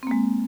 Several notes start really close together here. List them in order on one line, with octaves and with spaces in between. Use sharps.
C4 A#3 G#3